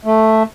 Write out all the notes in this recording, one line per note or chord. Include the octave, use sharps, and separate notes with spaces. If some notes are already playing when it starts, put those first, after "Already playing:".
A3